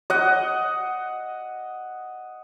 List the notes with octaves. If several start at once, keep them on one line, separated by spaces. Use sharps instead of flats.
D#5 F#5